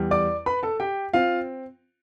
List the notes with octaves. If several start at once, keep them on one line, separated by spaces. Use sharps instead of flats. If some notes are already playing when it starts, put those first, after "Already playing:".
Already playing: E2 G3
D5 D6
B4 B5
A4 A5
G4 G5
C4 F4 F5